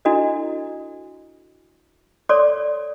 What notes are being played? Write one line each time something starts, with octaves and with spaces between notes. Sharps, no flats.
D4 E4 F#4 A4 D#5
A4 C#5 D5 C6 D6